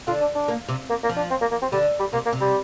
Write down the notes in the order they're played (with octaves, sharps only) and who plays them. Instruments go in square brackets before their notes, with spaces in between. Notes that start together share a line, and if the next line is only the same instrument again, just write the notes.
[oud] D3 [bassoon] F4
[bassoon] D4
D4
[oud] A#3
C3
[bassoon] A#3
A#3
[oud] F3
[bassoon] D4
C4
A#3
A#3
C4
[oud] D3 [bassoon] G3
[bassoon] G3
[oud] C3 [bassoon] A#3
[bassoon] A#3
[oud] C3
[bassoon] G3